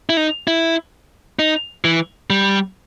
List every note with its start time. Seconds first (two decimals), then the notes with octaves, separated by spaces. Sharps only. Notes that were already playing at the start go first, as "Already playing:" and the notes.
0.09 E4
0.17 D#4
0.47 E4
1.39 D#4
1.85 E3
2.30 G3